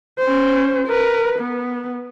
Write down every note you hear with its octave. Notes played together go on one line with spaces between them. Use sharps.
C#4 C5
A#4 B4
B3